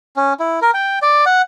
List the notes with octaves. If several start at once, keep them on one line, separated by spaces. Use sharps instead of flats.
C#4
E4
A#4
G5
D5
F#5